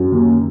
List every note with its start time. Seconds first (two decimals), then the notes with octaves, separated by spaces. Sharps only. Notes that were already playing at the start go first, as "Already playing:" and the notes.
Already playing: F#2
0.12 D#2